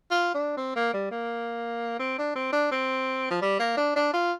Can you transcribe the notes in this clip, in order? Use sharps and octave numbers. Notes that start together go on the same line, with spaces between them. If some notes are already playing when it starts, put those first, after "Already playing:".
F4
D4
C4
A#3
G3
A#3
C4
D4
C4
D4
C4
F3
G3
A#3
D4
D4
F4